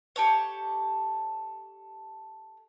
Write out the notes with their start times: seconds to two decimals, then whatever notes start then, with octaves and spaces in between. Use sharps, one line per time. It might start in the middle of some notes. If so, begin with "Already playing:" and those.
0.16 G4 A4 C#5